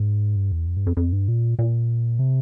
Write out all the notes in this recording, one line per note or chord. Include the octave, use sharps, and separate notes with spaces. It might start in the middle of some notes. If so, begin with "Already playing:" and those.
Already playing: G#2
G2
E2
F2
G2
F2
F2
G2
A#2
A#2
C3